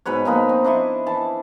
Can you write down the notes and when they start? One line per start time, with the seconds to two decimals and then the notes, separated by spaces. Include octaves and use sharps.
0.06 G#2 B2 B4 C#5
0.25 A#2 F3 D#4 B4
0.49 C4
0.64 D4 E4 D#5 C#6
1.07 E3 A5